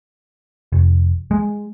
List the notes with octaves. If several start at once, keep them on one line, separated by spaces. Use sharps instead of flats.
F1
G#3